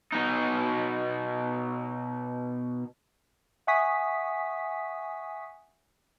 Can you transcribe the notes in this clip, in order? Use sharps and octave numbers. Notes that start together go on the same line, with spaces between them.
B2 D#4
E5 F#5 G#5 C#6 D#6 B6